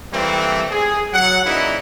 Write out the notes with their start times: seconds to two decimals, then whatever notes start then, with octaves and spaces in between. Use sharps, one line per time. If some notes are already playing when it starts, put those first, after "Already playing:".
0.13 E3 G3 A3 A#3 C4
0.71 G#4
1.13 F#3 F#5
1.46 A#2 C#3 E3 D#4 E4